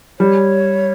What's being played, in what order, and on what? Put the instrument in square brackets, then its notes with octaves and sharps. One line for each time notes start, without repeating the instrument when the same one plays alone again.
[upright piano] G3 [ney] C#5